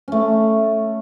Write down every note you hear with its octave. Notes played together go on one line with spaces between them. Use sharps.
A3 C#4